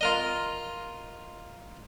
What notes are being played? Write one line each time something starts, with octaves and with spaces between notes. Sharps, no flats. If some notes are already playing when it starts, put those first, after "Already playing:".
F4 A#4 D#5